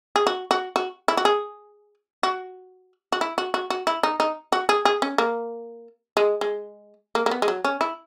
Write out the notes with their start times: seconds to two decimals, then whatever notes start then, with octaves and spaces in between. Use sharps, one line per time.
0.16 G#4
0.27 F#4
0.51 F#4
0.76 F#4
1.08 E4
1.17 F#4
1.25 G#4
2.23 F#4
3.12 F#4
3.21 E4
3.38 F#4
3.54 F#4
3.70 F#4
3.87 E4
4.03 D#4
4.20 D#4
4.52 F#4
4.69 G#4
4.85 G#4
5.02 C#4
5.18 A#3
6.17 G#3
6.41 G#3
7.15 A#3
7.26 A#3
7.31 B3
7.42 G#3
7.48 F#3
7.65 C#4
7.81 E4